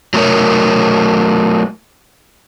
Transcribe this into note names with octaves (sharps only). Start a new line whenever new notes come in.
F#3 A3 A#4 C#5